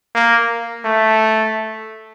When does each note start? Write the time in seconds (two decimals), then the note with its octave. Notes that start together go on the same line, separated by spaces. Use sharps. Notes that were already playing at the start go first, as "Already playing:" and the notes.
0.15 A#3
0.85 A3